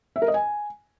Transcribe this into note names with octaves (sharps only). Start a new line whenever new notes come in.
E5
A#4
D#5
G#5